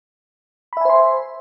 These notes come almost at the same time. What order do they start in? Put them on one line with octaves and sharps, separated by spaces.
B5 E5 G#5 C5 C6